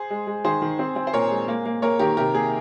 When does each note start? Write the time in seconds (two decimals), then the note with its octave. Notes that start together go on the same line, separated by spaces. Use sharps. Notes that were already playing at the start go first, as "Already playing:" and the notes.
Already playing: G#4 C5
0.10 G#3
0.27 G#3
0.45 D#3 G#4 C5
0.62 D#3
0.79 C4
0.96 C4
1.07 C5
1.13 A#2 A#4 C#5
1.31 G#3
1.48 A#3
1.66 A#3
1.82 A#3 A#4 C#5
1.99 D#3 G4 A#4
2.17 C3 G4 A#4
2.34 A#3 G#4